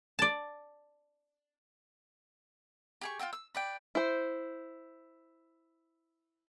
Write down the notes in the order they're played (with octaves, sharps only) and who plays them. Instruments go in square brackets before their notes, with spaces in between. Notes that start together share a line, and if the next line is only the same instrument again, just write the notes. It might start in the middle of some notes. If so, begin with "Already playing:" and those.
[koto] D5 A5
[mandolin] G4 G#4 C#6
F4 G4 G5 E6
E6
B4 D5 G5
[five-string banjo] E4 C5